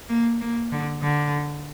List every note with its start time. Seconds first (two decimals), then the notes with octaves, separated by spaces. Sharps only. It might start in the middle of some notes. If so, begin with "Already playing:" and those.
0.09 A#3
0.41 A#3
0.72 D3
1.03 D3